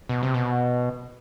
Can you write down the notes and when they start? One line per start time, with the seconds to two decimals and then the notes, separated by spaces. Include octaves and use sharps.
0.09 B2
0.23 C3
0.34 B2